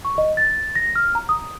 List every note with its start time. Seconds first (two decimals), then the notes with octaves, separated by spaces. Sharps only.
0.05 C#6
0.18 D#5
0.37 A6
0.75 A#6
0.96 F6
1.15 A#5
1.29 D#6